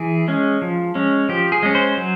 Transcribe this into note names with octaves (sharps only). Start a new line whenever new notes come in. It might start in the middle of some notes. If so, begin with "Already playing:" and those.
Already playing: E3 G#4
G#3 C#4
F3
G#3 C#4
F3 G4
G#4
G#3 C#4
C5
F#3